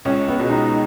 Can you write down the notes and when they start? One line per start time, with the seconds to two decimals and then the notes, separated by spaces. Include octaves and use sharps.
0.05 C#2 C#4
0.28 B3
0.39 B2 G#3
0.50 D#4